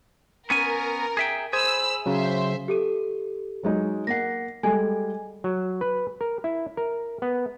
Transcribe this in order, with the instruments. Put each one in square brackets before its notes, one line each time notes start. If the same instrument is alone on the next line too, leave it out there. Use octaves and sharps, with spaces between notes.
[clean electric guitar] B3 C#4 G#5 [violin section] A#4
[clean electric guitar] G#4 E5 G5
[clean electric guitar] G#4 [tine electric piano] C5 [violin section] B5 E6
[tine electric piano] C#3 F#3 [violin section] C5 E5
[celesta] G4 A4 D#7
[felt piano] F#3 G#3 D#4
[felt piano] A#3 F#5 [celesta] A#6 C7
[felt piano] G3 G#3 [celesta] A4 G#5 G#6
[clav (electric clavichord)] F#3
B4
A#4
E4
A#4
B3